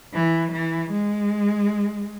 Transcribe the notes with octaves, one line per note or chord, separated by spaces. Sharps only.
E3
E3
G#3